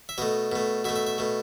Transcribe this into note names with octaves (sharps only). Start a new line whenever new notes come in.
E5
B2 A3 D#5
B2 A3
B2 A3 E5
E5
E5
B2 A3